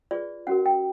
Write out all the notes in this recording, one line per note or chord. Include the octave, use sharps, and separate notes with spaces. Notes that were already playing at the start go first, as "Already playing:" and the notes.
F4 G#4 B4 D5
C#4 F#4 A#4 F#5
G5